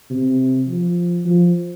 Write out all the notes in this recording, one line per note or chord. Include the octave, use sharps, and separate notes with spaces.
C3
F3
F3